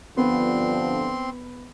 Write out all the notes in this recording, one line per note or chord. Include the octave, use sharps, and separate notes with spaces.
G2 D3 F3 B3 C4 C6